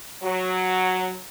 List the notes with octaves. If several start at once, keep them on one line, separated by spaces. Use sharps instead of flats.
F#3